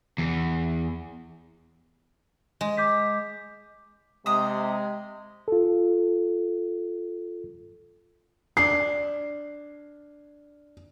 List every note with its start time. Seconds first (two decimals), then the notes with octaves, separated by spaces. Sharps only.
0.18 E2
2.61 G#3
2.77 D6 G6 B6
4.26 C3 G#3 A#5 D#6
5.48 F4 A4
8.57 D4 C6 C7